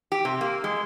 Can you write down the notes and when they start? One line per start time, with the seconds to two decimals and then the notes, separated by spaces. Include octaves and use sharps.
0.12 G4
0.25 C3
0.41 A#3
0.64 G#3